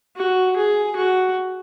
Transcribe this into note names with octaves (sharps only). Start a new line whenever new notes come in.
F#4
G#4
F#4